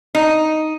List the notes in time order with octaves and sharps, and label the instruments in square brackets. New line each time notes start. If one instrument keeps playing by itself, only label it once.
[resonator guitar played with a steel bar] D#4